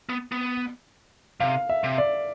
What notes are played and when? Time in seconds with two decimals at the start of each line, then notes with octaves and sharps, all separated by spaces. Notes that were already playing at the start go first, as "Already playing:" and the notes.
0.09 B3
0.32 B3
1.40 C3 F5
1.69 E5
1.84 C3
1.98 D5